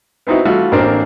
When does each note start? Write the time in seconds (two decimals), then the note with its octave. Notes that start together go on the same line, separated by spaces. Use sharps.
0.27 B3 C4 D#4 E4 F#4
0.45 G3 A3 F4 F#4 F5
0.72 A1 A#3 C4 D4 A#4